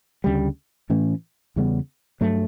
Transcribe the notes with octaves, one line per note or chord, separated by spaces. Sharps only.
D2 C#3 G3
A2 E3 A3 C#4
E2 C#3 G3 B3
G2 F#3 A3